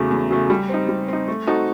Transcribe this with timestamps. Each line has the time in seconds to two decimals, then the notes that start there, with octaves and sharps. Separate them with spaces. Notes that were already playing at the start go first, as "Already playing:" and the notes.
Already playing: E2 C#3 F#3 A3
0.11 E2
0.30 C#3 F#3 A3
0.50 G3
0.69 C4 D#4
0.89 G3
1.08 C4 D#4
1.28 A3
1.47 C4 D#4 F#4 A4